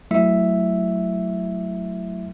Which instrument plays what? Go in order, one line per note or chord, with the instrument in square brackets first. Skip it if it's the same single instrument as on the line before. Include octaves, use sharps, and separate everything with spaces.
[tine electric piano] F#3 A3 E4 E5